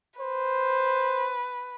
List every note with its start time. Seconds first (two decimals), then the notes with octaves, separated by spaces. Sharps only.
0.20 B4 C5